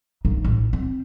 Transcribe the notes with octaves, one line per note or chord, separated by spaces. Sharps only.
G2 D#4
A1
C4